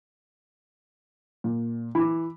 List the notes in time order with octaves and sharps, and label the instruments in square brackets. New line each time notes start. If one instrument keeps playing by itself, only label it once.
[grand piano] A#2
[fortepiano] E3 [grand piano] B5 D6